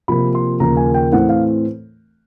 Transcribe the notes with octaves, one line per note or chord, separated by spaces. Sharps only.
C3 F3 A#3 B5
C6
D#2 C#3 F3 A#3 A#5
G#5
G5
A2 E3 A3 C4 F#5
F5